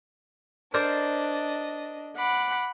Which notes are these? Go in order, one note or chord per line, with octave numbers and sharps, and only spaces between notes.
D4 A#4 C5 D5 D#5
F#5 B5 D6